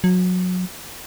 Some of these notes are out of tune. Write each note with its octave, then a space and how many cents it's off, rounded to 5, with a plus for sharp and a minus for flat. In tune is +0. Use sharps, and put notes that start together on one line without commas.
F#3 -25